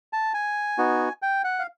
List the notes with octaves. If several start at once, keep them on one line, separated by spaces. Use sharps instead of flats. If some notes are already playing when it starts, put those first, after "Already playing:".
A5
G#5
B3 D#4 F#4
G5
F#5
F5